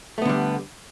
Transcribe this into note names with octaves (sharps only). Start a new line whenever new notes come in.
D3 G3 A3 B3